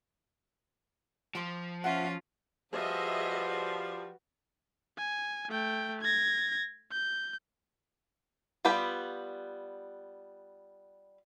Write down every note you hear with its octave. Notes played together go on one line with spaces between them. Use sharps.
F3 G5 C6 D6
C#4 F4 C5 E5 F#5
F3 G3 F#4 G#4 B4 D#5 E5
G#5
A3 G5
G#6 A#6
G6
G3 B3 F4 G4 B5